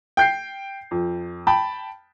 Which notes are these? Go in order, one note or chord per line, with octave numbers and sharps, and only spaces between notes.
G5 G6 C7
F2
G5 A5 B5